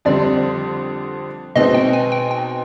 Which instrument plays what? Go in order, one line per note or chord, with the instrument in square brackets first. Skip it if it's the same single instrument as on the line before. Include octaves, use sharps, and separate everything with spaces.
[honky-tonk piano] F2 D3 G3 C4 [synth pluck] D5
[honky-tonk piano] B2 G#3 C4 D#4 [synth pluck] D#5
[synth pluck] G5
G#5
G5
G5